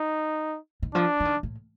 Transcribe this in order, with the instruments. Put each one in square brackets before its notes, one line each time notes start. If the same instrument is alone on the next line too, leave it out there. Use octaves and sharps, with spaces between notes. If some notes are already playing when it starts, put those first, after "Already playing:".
Already playing: [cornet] D#4
[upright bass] D#3
[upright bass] F3 [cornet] D4
[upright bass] F3
D#3
A2